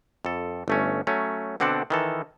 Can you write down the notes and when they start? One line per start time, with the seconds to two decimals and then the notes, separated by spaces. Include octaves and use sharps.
0.25 F2 A4
0.68 G1 A3 C#4
1.07 F#3 A3 C#4
1.60 B2 D3 C4 D4 F#5 A5
1.90 D#3 E3 A4